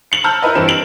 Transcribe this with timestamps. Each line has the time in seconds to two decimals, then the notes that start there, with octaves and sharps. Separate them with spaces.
0.12 C#7 F#7
0.24 A5 A#5 E6 F6 G6
0.42 E4 A#4 B4 D#5
0.55 G2 E3 C4 E7
0.68 D7 F#7